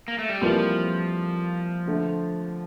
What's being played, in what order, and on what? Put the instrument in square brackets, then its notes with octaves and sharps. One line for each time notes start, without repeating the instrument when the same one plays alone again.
[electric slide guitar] A#3
A3
G3
[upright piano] F2 E3 G3 A#3 F4 [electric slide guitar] F3
[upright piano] D3 A3